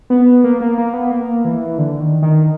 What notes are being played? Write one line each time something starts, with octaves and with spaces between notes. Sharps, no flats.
B3
A#3
A#3
A#3
B3
A#3
E3
D3
D#3
D#3